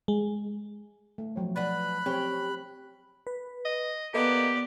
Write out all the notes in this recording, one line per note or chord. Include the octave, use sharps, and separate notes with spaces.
G#3
A3
F3 F#3 C#5
D4 B4 F#5 B5 F#6
C4 C#4 G4 C#5 G5
B4
D#5
A#3 B3 G4 A4 B4 D5 D#5